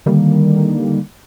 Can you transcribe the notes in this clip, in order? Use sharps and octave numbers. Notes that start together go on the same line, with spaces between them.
D3 D#3 G3 A#3